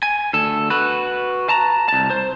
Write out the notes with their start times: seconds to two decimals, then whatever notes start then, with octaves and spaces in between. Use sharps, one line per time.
0.03 G#5
0.33 D2 A4
0.70 F#4 B4
1.49 A5 A#5
1.88 C2 A5
2.10 C5